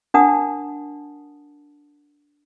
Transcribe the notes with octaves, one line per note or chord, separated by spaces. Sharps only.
D4 A#4 F#5 A5 D#6